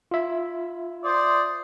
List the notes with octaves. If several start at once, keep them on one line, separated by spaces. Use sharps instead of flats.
F4 E5
C5 D5 D#6